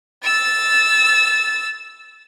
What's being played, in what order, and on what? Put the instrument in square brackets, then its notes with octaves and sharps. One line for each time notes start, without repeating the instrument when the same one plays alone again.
[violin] E6 A6